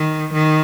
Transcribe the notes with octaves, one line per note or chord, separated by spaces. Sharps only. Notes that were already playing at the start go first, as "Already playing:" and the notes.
Already playing: D#3
D#3